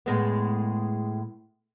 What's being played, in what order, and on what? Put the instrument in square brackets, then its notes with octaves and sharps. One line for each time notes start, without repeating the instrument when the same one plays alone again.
[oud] A2 G#3 B3